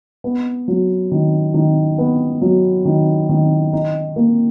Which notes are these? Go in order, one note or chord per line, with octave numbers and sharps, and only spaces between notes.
B3
F#3
D#3
D#3
B3
F#3
D#3
D#3
D#4
A#3